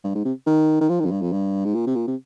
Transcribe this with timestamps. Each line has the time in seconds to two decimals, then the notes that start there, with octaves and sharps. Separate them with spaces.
0.03 G2
0.15 G#2
0.25 C3
0.46 D#3
0.81 D#3
0.89 F3
1.00 D#3
1.05 F2
1.11 G2
1.21 F2
1.32 G2
1.65 G#2
1.74 A#2
1.87 C3
1.96 A#2
2.07 C3